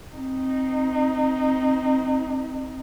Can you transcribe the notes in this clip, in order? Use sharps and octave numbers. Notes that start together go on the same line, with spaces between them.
C4 D#4